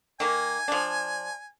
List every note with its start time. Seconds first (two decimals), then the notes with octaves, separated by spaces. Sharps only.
0.20 D#3 A#3 G#5
0.68 F3 D4